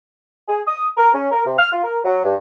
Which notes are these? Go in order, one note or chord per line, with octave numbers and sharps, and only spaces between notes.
G#4
D#6
A#4
C#4
A#4
C3
F6
F4
A#4
F#3
G2